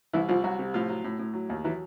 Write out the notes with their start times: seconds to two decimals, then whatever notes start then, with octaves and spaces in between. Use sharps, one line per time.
0.13 C2 E3 E4
0.29 C2 F3 F4
0.44 C2 F#3 F#4
0.59 C3
0.74 A2 F3 F4
0.89 F#3
1.04 A2
1.19 A2
1.34 F#3
1.50 D#2
1.64 E3 F#3 E4